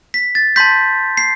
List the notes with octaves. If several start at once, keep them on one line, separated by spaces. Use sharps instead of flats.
B6
A6
A5 C6 G6 B6
C7